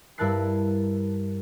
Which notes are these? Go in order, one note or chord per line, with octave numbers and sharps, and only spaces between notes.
G2 E4 A#4 A5 F#6 C7